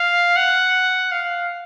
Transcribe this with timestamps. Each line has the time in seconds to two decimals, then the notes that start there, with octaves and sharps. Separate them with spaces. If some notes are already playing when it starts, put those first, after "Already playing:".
Already playing: F5
0.37 F#5
1.12 F5